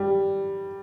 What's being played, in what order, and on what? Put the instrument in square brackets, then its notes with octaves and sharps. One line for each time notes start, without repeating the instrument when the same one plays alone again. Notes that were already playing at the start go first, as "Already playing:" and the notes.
Already playing: [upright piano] G3